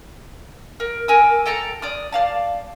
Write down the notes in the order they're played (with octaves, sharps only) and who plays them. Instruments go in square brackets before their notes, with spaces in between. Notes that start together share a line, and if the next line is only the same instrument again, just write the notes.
[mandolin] A#4
A#4 G#5 D6 E6
A4 G5 A5 A#5
D5 D#6 F6
D5 F5 A5